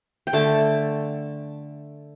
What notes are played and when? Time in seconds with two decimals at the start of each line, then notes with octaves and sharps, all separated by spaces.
0.27 G5
0.33 D3 A3 A5